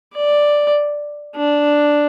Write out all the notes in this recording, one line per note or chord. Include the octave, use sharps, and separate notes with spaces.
D5
D4